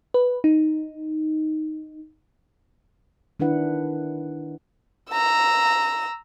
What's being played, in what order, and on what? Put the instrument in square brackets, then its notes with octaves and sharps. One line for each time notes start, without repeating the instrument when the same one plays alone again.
[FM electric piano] B4
D#4
[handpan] D#3 D4 E4 B4 F#5
[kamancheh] A#5 E6